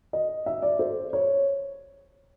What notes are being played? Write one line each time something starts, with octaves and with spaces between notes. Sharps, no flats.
D#5
E5
D5
C5
C#5